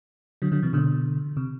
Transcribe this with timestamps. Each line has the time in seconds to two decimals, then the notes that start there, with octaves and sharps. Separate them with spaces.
0.42 D3 F#3
0.52 D3 F#3
0.63 C3 E3
0.73 B2 D3
1.37 C3